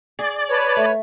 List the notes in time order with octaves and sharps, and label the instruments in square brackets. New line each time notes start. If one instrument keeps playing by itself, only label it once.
[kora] G#4 [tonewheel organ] D5
[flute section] B4 A5 [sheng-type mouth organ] C#5
[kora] A3